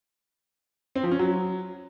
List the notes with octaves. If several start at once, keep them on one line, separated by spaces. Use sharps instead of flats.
C4
F3
C#4
F#3